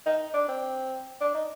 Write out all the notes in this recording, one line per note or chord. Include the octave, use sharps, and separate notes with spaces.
D#4
D4
C4
D4
D#4